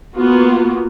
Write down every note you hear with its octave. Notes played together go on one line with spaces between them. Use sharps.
A#3 B3 F4 F#4